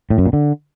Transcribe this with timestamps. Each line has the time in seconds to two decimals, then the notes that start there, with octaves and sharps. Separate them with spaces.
0.10 A2
0.18 F#2
0.26 A#2
0.33 D3